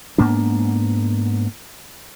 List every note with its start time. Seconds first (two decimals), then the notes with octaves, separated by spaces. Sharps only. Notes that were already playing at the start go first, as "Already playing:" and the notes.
0.18 G#2 A#3 B3 D4